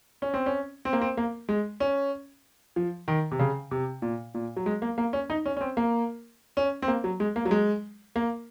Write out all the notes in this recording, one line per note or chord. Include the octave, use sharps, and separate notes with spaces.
C#4
C4
C#4
C4
A#3
C4
A#3
G#3
C#4
F3
D#3
C3
C#3
C3
A#2
A#2
F#3
G#3
A#3
A#3
C#4
D#4
C#4
C#4
C4
A#3
C#4
C4
A#3
F#3
G#3
A#3
F#3
G#3
A#3